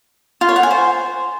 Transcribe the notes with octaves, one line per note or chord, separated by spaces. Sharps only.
F4
C#5
F#5
G#5
C5